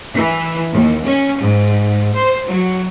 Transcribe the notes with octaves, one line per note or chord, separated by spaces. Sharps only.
E3
D#2
C#4
G#2
C5
F#3